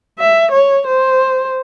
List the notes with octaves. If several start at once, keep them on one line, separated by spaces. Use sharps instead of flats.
E5
C#5
C5